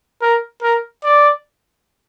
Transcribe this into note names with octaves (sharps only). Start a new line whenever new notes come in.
A#4
A#4
D5